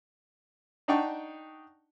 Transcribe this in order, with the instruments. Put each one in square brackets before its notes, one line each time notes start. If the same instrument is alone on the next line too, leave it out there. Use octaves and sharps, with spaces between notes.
[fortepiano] D4 D#4 F#5 G5 A5 C#6